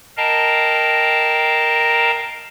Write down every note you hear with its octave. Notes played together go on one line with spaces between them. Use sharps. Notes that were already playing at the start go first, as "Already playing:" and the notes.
A#4 D#5 F5 G5 A5 A#5